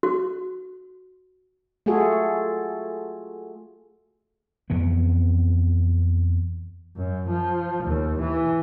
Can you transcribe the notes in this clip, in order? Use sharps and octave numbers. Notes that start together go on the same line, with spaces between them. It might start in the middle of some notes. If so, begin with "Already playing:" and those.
F#4
A3 F4 F#4 G#4 A4
F2 E3 B3
F#2
F3
D#2
E3